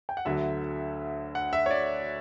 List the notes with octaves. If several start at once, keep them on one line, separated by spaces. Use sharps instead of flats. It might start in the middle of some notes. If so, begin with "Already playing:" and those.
G5
F#5
D2 D3 F#3 E5
F#5
E5
C#5
D5